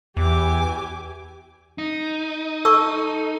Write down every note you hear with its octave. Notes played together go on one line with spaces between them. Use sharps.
E2 E3 G4 G#5 D6
D#4
A4 C#6 E6